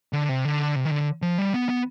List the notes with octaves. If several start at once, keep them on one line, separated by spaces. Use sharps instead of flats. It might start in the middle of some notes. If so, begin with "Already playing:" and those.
D3
C3
D3
C3
D#3
D3
F3
G3
B3
B3